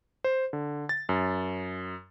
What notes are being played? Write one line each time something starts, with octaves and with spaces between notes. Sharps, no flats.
C5
D3
A6
F#2